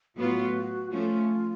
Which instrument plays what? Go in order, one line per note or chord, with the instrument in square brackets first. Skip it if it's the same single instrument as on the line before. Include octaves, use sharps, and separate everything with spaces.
[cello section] A2 F#3 B3 F4 [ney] F#4
[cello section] F3 A3 C#4 [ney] F4